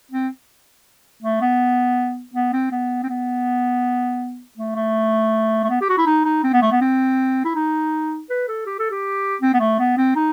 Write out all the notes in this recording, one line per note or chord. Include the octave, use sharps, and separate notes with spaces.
C4
A3
B3
B3
C4
B3
C4
B3
A3
A3
A3
B3
G4
F#4
E4
D#4
D#4
C4
B3
A3
B3
C4
E4
D#4
B4
A4
G4
A4
G4
C4
B3
A3
B3
C4
D#4